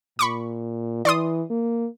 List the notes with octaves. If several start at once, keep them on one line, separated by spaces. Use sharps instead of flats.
A#2 B5 C#6 D6
E3 D5 C6 D#6
A#3